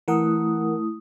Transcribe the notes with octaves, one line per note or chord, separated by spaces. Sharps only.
E3 A3 E4 A#4 F#5 D#6